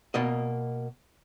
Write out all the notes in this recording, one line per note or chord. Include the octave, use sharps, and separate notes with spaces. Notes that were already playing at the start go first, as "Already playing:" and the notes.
B2 A#3 D#5